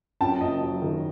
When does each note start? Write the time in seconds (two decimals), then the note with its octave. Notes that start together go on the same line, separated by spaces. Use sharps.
0.21 F#2 G5 A5
0.41 F#1 D#5
0.62 F#3
0.82 D#3